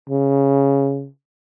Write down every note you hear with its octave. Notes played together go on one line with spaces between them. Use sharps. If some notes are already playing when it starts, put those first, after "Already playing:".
C#3